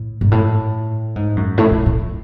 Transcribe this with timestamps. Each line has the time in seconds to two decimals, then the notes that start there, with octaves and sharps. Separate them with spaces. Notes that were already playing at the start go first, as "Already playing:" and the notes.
Already playing: A2
0.21 G#2
0.31 A2
1.16 G#2
1.37 F#2
1.58 A2
1.71 A2
1.86 A2